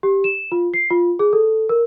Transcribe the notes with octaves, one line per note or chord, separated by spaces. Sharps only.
G4
E7
F4
C7
F4
G#4
A4
A#4